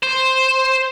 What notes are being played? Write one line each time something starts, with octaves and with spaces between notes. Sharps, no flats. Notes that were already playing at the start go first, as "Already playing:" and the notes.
C5